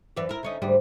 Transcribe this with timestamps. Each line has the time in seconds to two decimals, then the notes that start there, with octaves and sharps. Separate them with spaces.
0.17 F#2 E3 D5
0.29 E4 A#4
0.43 D3 C#4 D#4
0.62 D2 G#2 G3